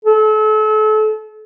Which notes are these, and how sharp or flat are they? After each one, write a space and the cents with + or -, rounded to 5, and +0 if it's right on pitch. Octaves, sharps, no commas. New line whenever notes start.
A4 -35